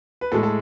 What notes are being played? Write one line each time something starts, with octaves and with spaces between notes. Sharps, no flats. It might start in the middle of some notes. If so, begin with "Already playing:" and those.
B4
A2 G#3 A4
A4